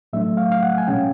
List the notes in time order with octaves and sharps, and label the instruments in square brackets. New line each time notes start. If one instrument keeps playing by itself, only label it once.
[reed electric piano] A2 F#3 A3 D4 E5
F5
F5
F#5
G#5
B2 G#3 C#4 G5